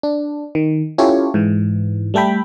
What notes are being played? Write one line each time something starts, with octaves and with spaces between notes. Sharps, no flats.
D4
D#3
C#4 E4 F4 G4 A4 C#5
G#2 E3
G3 A3 A4 G5 B5